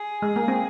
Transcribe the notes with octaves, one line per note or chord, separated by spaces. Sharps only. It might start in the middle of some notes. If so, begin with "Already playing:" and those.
Already playing: G#4
G#3
A#3
C4